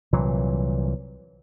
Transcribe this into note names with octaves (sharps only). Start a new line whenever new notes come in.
C2 A#2 E3 F#3